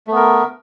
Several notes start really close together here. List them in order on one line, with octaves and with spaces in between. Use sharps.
A3 B3 A#4